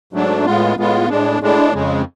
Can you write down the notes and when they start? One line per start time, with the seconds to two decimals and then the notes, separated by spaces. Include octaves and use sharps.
0.13 G#2 F#3 A3 D4
0.45 A2 G#3 B3 F4
0.77 A2 G#3 B3 F4
1.10 A2 G#3 D4
1.41 A2 G#3 D4
1.74 F2 C#3 G#3